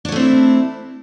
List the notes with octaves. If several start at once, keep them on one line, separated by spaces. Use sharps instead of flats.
A3 C4 D4 E4 C#5